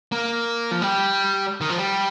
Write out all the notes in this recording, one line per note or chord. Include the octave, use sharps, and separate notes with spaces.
A#3
F3
G3
D#3
F3
G3